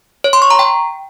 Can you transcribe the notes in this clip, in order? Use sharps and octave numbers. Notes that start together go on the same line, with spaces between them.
C#5
C6
C#6
A#5
G5